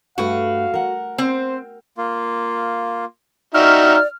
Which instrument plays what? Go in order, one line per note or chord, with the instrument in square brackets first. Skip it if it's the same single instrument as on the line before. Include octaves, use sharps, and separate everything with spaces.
[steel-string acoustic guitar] G2 A3 B4 [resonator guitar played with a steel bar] F#4 [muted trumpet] F5
[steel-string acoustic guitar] A#4 F#5
[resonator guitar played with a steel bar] C4 [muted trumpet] C5
[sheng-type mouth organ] A#3 F4
[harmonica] D#4 F#4 E5 [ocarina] D5 [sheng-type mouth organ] G5 A#5 C#6 [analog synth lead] F6